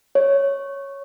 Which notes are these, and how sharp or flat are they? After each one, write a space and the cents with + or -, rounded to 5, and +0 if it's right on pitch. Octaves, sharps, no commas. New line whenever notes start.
C#5 -5